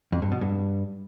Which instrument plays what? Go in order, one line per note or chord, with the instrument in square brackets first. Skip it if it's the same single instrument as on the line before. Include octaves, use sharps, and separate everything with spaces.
[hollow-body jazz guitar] F2
G2
B2
G2